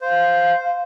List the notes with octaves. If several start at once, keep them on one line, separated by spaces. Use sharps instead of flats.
C5 F5